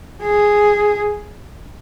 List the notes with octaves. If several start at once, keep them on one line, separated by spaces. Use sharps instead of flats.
G#4